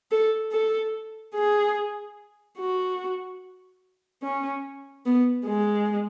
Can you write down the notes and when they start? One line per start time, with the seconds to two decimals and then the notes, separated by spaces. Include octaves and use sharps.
0.11 A4
0.52 A4
1.35 G#4
2.58 F#4
4.23 C#4
5.06 B3
5.46 G#3